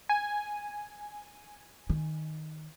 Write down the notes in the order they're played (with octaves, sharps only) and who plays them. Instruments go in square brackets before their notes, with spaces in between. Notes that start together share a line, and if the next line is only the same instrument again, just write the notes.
[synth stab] G#5
[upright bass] D#3